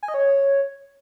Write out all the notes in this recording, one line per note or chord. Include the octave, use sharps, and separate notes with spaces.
G#5
D#5
C#5